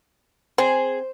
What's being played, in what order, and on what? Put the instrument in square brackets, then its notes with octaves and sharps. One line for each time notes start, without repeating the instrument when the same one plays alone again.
[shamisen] C4 [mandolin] G#4 [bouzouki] C5